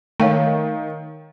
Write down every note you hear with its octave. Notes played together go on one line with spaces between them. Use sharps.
D#3 A3 C#5 F5 G5